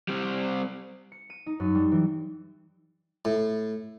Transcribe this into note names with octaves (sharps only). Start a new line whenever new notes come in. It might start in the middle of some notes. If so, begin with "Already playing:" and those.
G3 C4
C#7
D#7
D#4
F#2
G3
E3
A2